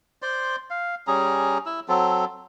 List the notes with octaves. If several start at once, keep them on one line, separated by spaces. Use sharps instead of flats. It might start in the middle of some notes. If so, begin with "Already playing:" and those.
C5 D5 C6
F5
G3 C#4 G#4 A#5
E4 E6
F#3 C4 A4